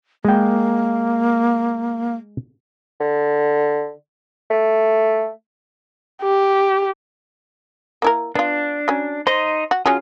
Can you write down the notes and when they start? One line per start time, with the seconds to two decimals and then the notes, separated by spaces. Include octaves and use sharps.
0.25 G#3 A#3 G5
3.00 D3
4.51 A3
6.23 G4
8.02 A#3 E4 A#4
8.35 B3 D4 F4
8.88 F#3 C#4
9.27 D#4 C5 D#5 C6
9.71 F#4
9.86 F#3 C#4 F4 G#4